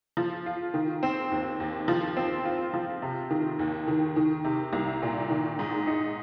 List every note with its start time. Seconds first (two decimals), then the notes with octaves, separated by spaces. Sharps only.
0.17 F3
0.46 F4
0.74 D#3
1.03 C4
1.32 D#2
1.60 D#2
1.88 F3
2.17 C4
2.45 F4
2.73 F3
3.02 C3
3.31 D#3
3.59 D#2
3.88 D#3
4.16 D#3
4.44 C3
4.73 C2
5.02 A#2
5.30 D#3
5.59 G#2
5.87 D#4